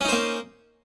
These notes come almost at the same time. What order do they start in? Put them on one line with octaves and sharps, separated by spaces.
C#4 D#4 C5 A#3